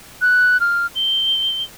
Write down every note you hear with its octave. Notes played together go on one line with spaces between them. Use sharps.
F#6
F6
G7